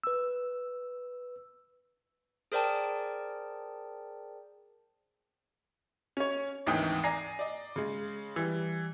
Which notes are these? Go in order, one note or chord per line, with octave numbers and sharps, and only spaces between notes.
B4 E6
G#4 A#4 C5 D5 G5 A5
C#4 C#5
G#1 D2 D#3 E3 G5 D#6
D5 G#5 A#5 A#6 C7
D5 D#5
C#3 G#3
E3 G3